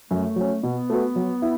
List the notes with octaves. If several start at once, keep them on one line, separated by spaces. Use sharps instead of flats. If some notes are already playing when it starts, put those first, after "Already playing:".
F#2 A3
F#3 C#4
B2 B3
A3 F#4 B4
F#3
E4